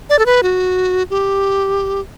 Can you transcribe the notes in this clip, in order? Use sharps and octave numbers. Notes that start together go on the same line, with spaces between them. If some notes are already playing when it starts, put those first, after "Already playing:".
D5
A4
B4
F#4
G4